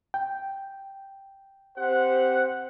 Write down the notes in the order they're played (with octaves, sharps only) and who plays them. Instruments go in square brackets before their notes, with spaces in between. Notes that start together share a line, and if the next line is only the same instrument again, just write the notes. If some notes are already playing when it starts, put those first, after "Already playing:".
[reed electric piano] G5
[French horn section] C4 G4 C5 [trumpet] F#5